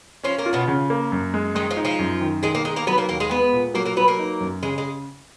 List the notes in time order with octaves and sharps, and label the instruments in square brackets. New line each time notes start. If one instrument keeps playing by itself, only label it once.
[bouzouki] F3 F4 [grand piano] C#4
[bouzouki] A#3 A#4
[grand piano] F4
[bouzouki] B2 B3
[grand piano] C#3
A#3
F#2
G#3
[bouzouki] D#3 D#4 [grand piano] G#3
[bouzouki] F3 F4
[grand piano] D#4
[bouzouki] F3 F4
[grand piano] F#2
D#3
[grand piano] D#3 [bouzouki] G#3 G#4
[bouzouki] A#3 A#4
[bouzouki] G#3 G#4 [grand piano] D#4
[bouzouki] A#3 A#4
[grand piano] F#3 [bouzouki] B3 B4
[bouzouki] A#3 A#4
[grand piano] D#2 [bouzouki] A#3 A#4
[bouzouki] G#3 G#4
[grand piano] G#3 [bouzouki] B3 B4
[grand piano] A#2
[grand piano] F#3 [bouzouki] A#3 A#4
[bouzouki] A#3 A#4
[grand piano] F#3 [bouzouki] B3 B4
[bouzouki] A#3 A#4
[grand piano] D#4
F#2
[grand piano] C#3 [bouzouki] G#3 G#4
[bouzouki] G#3 G#4